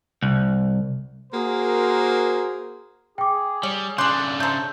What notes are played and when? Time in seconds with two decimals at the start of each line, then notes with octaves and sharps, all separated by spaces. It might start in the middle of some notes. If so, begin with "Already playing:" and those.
0.23 C2
1.32 A#3 F#4 G#4 A#4 C5
3.18 G#4 G5 D6
3.63 G3 C#5
3.98 C#3 E3 D4 C6 D6 F#6 G6
4.40 A3 C5 A5 A#5 E6 G6